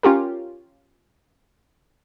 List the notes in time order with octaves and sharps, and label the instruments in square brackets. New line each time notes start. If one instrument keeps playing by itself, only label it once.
[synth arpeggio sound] C#4 F4 G4 A#4